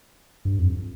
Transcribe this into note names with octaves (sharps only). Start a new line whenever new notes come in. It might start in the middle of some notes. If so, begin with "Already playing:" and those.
G2
F2